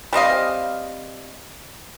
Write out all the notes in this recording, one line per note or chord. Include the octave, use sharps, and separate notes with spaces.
G3 C4 D#5 F5